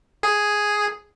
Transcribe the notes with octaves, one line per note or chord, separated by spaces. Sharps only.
G#4